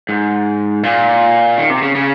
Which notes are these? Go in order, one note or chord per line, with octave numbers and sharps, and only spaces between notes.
G#2
A#2
D#3
C3
C#3
C#3